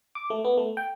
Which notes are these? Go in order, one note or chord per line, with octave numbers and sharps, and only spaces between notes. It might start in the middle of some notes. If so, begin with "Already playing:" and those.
D6
A3
B3
A3
G5